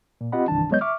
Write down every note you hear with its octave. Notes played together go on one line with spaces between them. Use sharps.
A#2
C4 F4 G4 D#5 F#5 B5
C2 G2 D#3 E3 D4 A5
F#3 G#3 B3 C#5 D#5 G6
E5 C#6 D6 F6